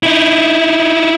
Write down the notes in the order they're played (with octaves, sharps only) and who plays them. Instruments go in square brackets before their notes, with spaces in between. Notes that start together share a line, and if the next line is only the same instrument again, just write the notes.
[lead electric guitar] D#4 E4